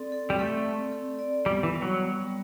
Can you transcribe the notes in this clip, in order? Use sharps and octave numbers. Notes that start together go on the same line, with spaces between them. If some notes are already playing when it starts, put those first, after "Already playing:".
Already playing: C4 A4 D5
A4
G3
A3 A4
C4
A4
D5
G3 B3
E3
G3
F#3
B3
G3